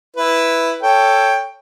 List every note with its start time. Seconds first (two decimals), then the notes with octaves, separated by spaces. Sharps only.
0.16 E4 B4
0.82 A4 C#5 G5